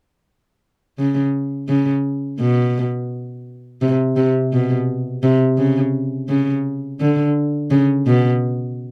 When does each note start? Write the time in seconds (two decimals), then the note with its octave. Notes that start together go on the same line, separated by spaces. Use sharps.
0.98 C#3
1.68 C#3
2.40 B2
3.82 C3
4.16 C3
4.53 B2
5.23 C3
5.58 C#3
6.29 C#3
7.00 D3
7.71 C#3
8.07 B2